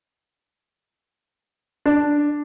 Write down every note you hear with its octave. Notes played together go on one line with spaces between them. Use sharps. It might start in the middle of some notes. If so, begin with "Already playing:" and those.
D4